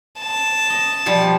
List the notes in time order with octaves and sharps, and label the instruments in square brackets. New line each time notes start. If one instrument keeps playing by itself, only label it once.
[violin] A5
[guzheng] D#5
B2 F3 G3